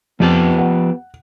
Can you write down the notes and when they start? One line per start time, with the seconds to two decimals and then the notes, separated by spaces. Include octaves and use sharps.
0.20 F2 F3 B3 G4 A5
0.58 F#5